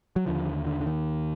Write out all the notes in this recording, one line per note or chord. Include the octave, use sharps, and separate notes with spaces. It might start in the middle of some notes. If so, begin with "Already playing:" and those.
F#3
D#2 D3 F3
D3
D3
D#3